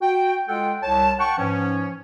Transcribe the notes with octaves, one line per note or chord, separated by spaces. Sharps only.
F#4 G5
G#3 F4 A4 F#5 G5
C2 C#5 A5
F#5 G5 A5 C#6
G#2 E3 F3 C#4